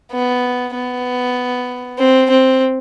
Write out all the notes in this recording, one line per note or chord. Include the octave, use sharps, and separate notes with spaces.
B3
B3
C4
C4